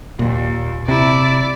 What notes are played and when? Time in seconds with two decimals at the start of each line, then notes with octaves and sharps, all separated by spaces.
0.19 D#2 A#2
0.88 C3 E4 D5